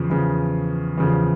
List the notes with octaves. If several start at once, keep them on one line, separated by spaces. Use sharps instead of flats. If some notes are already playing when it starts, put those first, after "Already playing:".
Already playing: E2 C#3 F3
E2 C#3 F3
E2 C#3 F3